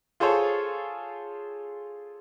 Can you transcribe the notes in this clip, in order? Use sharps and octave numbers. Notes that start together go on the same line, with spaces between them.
F4 G#4 A4 C5 C#5